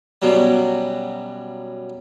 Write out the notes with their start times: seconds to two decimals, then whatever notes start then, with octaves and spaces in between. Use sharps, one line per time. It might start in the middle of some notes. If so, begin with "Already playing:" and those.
0.22 F#2 B2 F#3 G3